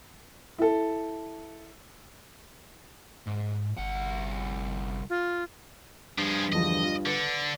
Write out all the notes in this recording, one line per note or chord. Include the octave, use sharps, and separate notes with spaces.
E4 A4
G#2
G1 C2 F#5
F4
G2 F3 G#4
E2 D3 F3 D#5
F4
D3 B4